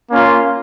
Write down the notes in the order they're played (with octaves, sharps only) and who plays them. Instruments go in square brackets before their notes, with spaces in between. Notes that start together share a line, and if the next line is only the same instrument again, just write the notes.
[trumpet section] A#3 C#4 F4